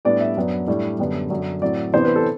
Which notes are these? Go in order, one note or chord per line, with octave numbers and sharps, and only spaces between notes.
A2 G3 B3 D4 D5
E5
F#2 F#3 B3 D4
A2 G3 D4
F#2 D3 G3 B3
F#2 D3 F#3
A2 F#3 C4 D5
C3 E3 B3 D4 C5
B4
A4